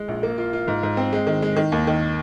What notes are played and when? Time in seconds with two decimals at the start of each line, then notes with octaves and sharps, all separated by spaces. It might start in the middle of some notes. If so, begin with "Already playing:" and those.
Already playing: G#3
0.08 A#1
0.23 A#3
0.38 F4
0.53 F4
0.68 G#2
0.83 G#2
0.97 C4
1.13 G#3
1.27 D#3
1.42 G#3
1.56 D#3
1.72 D#2
1.87 D#3